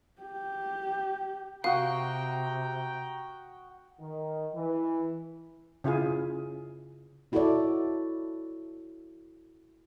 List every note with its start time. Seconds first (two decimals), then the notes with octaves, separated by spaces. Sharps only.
0.22 G4
1.64 C3 F#4 F5 G5 A#5 D#6
3.99 D#3
4.54 E3
5.84 C#3 E4 F4 G#4
7.32 D#4 E4 F#4 A4 C#5 D5